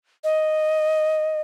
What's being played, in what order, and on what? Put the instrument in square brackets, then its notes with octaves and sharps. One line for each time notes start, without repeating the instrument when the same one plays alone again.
[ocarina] D#5